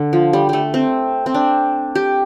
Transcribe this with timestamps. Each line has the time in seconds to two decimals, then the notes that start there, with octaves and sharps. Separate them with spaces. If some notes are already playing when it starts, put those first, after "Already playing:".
Already playing: D3
0.13 F3
0.33 G3
0.49 G3 A3
0.74 C4
1.26 C4
1.34 D4
1.95 G4